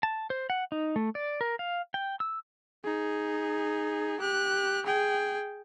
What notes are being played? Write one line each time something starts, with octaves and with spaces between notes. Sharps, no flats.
A5
C5
F#5
D#4
A3
D5
A#4
F5
G5
E6
D#4 G#4
G4 F#6
G#4 G5